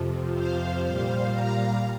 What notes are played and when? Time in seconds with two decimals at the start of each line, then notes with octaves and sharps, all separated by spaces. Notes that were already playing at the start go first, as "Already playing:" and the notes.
Already playing: F2 C3 F3
0.33 C5 F5
0.82 A#2 G3 C5 F5
1.32 F5 A#5